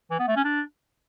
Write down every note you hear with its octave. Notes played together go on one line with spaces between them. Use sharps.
E3
B3
A3
C#4
D4